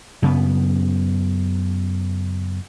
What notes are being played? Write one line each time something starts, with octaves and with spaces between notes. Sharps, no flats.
F#2 C#3 B3